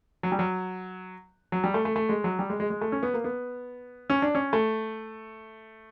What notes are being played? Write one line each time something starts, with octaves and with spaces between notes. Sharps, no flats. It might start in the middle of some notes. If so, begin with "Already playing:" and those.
F#3
G3
F#3
F#3
G3
A3
A3
A3
G#3
F#3
G3
G#3
G#3
G#3
A3
C#4
B3
A#3
B3
C#4
D4
C#4
A3